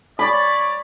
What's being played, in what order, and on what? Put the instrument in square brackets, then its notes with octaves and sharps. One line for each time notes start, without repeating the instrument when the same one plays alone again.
[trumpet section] C#5 D5 [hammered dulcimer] B5